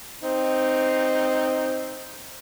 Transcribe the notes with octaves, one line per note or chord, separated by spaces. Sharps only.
C4 D#4